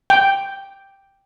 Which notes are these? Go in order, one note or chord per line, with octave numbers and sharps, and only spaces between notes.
G5